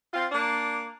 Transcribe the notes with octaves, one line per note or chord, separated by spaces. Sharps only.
C4 F4
A#3 D4